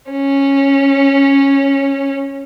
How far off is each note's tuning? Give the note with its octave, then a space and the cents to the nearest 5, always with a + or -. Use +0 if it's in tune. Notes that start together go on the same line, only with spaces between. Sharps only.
C#4 -10